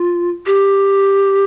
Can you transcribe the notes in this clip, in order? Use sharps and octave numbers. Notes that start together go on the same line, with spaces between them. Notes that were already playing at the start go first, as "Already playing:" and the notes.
Already playing: F4
G4